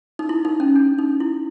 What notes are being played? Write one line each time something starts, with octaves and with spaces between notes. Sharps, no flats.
D#4
E4
D#4
C#4
D4
D#4
E4